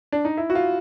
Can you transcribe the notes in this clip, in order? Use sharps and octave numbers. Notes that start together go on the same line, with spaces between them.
D4
D#4
E4
F#4
F4